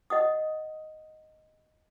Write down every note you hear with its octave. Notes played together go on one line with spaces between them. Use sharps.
D#5 F#5 D#6